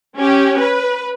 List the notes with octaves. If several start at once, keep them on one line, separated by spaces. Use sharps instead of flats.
C#4 G4
B4